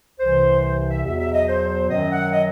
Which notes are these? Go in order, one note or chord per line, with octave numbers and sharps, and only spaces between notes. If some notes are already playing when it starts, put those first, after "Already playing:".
C2 C3 E3 C5
C5
E5
E2 B2 F#3 E5
E5
D#5
C5
F#2 D#3 F#3 D#5
F#5
D#5